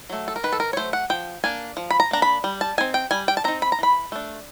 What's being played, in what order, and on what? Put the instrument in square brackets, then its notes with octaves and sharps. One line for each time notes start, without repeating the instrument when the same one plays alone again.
[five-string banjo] F#3 A3
A4
A#4
D#3 B4
A4
A#4
C#5
F#3 A3 C5
F#5
F3 G5
A#3 D4 G#5
F3
B5
A#5
A#3 D4 A#5
B5
G3
A5
C4 D#4 G#5
G5
G3 G#5
G5
A5
C4 D#4 A#5
B5
A#5
E3 B5
A3 D4